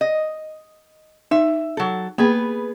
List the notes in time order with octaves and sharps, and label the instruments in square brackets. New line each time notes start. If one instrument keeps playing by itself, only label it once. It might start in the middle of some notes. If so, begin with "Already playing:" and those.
[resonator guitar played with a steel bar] D#5
[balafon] D#4 [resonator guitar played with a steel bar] E5
[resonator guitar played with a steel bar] F#3 A4
[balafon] A#3 [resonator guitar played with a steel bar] B3 G#4 B4